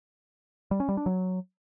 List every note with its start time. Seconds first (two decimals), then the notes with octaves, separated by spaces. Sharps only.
0.71 G3
0.80 C#4
0.89 G3
0.97 D4
1.06 F#3